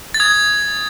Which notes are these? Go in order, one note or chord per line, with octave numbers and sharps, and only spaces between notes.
A6
D#6 G#6